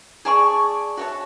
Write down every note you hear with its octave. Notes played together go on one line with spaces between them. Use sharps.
G#4 D5 A5 C#6
F#4 C#5 E5 A5